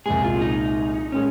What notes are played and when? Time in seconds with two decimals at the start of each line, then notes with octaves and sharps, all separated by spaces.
0.06 C2 A#2 G#3 G#4
0.24 F4
0.41 D#4
1.12 A#2 G#3 C#4